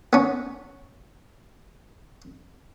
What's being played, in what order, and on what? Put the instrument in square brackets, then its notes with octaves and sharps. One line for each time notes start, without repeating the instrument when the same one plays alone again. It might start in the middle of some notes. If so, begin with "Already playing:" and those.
[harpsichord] B3 C#4